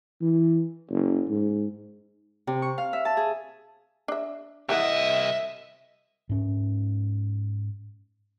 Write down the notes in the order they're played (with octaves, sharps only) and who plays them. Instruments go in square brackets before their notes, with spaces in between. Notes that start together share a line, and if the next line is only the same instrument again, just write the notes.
[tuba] E3
F#1
G#2
[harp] C3
C#6
F5
E5
A5
G#4
[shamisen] D4 E5
[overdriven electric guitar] C2 D#5 [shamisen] E3 G4 F#5 [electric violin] E5
[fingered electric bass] G#2 C#4